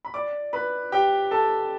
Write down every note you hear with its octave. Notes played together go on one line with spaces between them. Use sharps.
B5
D5 D6
B4 B5
G4 G5
A4 A5